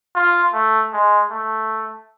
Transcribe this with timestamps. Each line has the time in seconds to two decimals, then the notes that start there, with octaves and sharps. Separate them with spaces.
0.15 F4
0.53 A3
0.93 G#3
1.30 A3